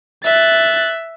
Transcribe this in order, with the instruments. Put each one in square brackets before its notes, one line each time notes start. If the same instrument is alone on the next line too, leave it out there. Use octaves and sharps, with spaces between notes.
[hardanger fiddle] E5 [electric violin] F#6 A6